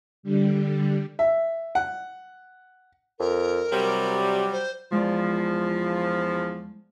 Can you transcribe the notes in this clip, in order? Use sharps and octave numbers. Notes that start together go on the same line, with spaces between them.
D3 G3
E5
F#5
F2 A#4
C3 F#3 G3
C5
E2 F3 G#3 D5